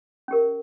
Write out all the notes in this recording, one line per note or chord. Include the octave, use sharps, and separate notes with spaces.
C#4 G4 A#4